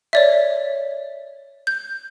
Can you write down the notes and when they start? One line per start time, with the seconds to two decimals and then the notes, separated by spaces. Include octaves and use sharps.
0.13 C#5 D5 E5
1.67 G6